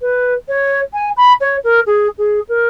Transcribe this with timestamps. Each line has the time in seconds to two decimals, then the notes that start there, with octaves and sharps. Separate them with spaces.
0.01 B4
0.48 C#5
0.93 G#5
1.17 B5
1.40 C#5
1.64 A#4
1.86 G#4
2.18 G#4
2.49 A#4